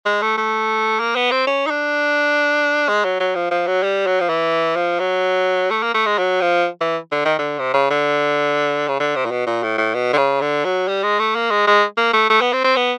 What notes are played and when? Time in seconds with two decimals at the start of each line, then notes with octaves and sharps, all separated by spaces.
0.06 G#3
0.22 A3
0.37 A3
1.00 A#3
1.16 B3
1.31 C4
1.47 C#4
1.67 D#4
1.70 D4
2.89 G#3
3.05 F#3
3.20 F#3
3.35 F3
3.51 F3
3.67 F#3
3.83 G3
4.06 F#3
4.20 F3
4.29 E3
4.76 F3
5.00 F#3
5.71 A3
5.83 A#3
5.94 A3
6.06 G#3
6.18 F#3
6.42 F3
6.81 E3
7.12 D3
7.25 D#3
7.39 D3
7.59 C3
7.74 C#3
7.91 D3
8.88 C#3
9.00 D3
9.16 C3
9.26 A#2
9.31 B2
9.46 A#2
9.63 A2
9.78 A2
9.94 B2
10.13 D3
10.18 C#3
10.41 D3
10.65 F#3
10.88 G3
11.04 G#3
11.19 A3
11.35 A#3
11.51 G#3
11.67 G#3
11.97 A#3
12.13 A3
12.30 A3
12.41 B3
12.53 C4
12.64 C4
12.76 B3